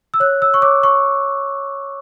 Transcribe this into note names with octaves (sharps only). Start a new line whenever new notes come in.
E6
C#5 F#6
E6
C#6
C#5 D6
C#6